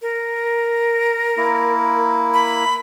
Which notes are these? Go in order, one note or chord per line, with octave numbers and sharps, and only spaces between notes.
A#4
A#3 E4
B5